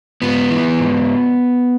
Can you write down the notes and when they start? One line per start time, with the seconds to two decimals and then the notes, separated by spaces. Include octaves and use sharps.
0.22 G#2 B3
0.50 E3
0.78 G#2